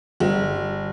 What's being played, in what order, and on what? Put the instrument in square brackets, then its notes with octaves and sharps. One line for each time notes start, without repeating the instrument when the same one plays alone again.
[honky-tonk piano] G1